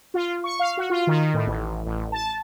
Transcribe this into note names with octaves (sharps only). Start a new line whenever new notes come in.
F4
C#6
F5
F#4
F4
D#3
A2
A1
A1
A5